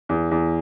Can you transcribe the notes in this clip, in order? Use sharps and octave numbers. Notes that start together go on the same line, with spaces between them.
E2
E2